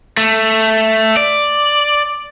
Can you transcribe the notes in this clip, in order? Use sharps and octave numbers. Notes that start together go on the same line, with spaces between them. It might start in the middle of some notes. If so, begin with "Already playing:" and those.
A3
D5